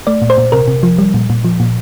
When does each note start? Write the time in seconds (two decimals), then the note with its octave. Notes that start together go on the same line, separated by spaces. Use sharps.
0.07 A3 D5
0.22 A#2
0.30 C5
0.38 A#2
0.52 C3 A#4
0.68 C3
0.83 F3
0.98 G3
1.14 A#2
1.30 A#2
1.45 F3
1.60 A#2